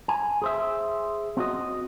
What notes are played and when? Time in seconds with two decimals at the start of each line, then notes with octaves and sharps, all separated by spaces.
0.08 G#5
0.42 G#4 C5 E5
1.37 C4 F#4 D#5